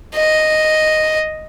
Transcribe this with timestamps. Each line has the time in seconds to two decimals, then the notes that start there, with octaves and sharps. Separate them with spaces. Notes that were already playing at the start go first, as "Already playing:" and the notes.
0.16 D#5